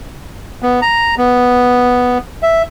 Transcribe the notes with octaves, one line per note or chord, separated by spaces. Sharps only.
B3
A#5
B3
E5